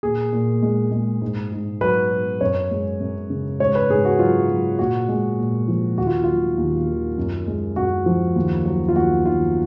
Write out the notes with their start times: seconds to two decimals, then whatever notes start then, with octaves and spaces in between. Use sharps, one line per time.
0.03 A#2 G#4
0.33 A#2
0.63 G#3
0.92 G#3
1.21 G#2
1.52 G#2
1.81 F#3 B4
2.11 F#3
2.41 F#2 C#5
2.71 G#3
3.00 F#2
3.30 C#3
3.60 G#2 C#5
3.75 B4
3.90 G#2 G#4
4.05 F#4
4.19 F#3 F4
4.49 F#3
4.79 A#2 F#4
5.09 G#3
5.38 A#2
5.68 F3
5.98 D#2 F#4
6.07 F4
6.24 F#3 F4
6.58 D#2
6.87 D#3
7.18 F#2
7.47 G#3
7.76 F#2 F#4
8.06 F3
8.36 D#2
8.65 F#3
8.88 F4
8.95 D#2 F#4
9.25 D#3 F4